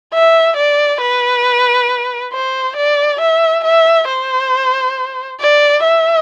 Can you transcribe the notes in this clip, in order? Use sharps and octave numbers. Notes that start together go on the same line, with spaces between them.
E5
D5
B4
C5
D5
E5
E5
C5
D5
E5